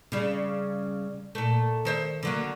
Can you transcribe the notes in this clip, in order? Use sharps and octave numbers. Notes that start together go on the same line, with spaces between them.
C#3 G3
A#2 A3
D#3 C5 E5
D3 F#3 A#3